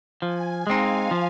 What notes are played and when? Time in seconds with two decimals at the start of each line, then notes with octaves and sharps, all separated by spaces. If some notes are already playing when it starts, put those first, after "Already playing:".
0.22 F3 G#5
0.66 G#3 C4 D#4 F5
1.11 F3